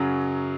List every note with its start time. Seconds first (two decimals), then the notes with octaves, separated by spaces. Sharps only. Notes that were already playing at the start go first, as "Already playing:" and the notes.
Already playing: F#2 C#3 F#3